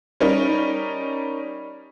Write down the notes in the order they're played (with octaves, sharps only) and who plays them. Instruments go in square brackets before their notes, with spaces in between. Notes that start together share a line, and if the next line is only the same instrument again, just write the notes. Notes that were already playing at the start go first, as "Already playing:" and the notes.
[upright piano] G3 C#4 D#4 A#4